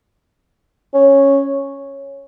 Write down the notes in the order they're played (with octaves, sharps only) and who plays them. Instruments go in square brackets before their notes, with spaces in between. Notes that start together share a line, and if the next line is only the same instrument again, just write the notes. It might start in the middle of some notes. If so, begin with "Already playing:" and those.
[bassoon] C#4